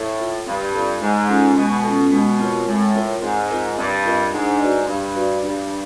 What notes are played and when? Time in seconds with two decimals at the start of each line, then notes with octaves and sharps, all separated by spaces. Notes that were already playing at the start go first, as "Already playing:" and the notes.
Already playing: A2
0.19 F4 A4
0.46 G2 C4
0.74 F4 A4
1.01 G#2 G#3
1.28 C#4 F4 A4
1.56 B2 G#3
1.84 C#4 F4 A4
2.11 B2 G#3
2.39 C4 F4 A#4 C#5
2.66 A2 G#3
2.95 C4 F4 A#4 C#5
3.22 G#2 C4
3.50 F4 A#4 D#5
3.78 G2 C4
4.05 F4 A#4 D#5
4.33 G#2 D4
4.60 F#4 B4 D5
4.87 G2 D4
5.15 F#4 B4 D5
5.43 G2 D4